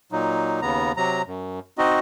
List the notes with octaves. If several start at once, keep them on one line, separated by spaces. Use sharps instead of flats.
A#2 F#3 D#4
D#2 C#3 B3 A#5
C3 F#3 A#5
F#2
C4 D#4 F#4 D#5